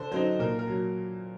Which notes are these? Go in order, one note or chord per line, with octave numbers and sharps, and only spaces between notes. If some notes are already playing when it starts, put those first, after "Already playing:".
Already playing: D3 C5
F#3 C4 D#4 C5
A#2 A#4
A#4
F#3